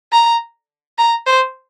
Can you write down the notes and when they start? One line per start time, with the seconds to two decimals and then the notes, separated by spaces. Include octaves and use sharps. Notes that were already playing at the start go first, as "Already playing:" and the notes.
0.12 A#5
0.98 A#5
1.26 C5